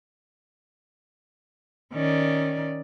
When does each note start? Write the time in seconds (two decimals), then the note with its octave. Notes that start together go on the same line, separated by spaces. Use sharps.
1.93 D#3 C#4 D5